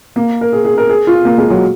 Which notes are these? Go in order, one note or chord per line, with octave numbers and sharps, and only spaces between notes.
A#3
A#4
G#4
G#4
A#4
G#4
F4
A#3
G#3
F#3